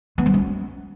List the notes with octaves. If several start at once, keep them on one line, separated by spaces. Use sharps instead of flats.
B3
G3
C#4